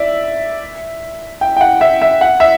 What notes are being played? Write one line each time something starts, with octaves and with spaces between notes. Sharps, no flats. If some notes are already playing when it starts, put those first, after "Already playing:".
Already playing: D5 E5
G5
G5
F#5
E5
E5
F#5
E5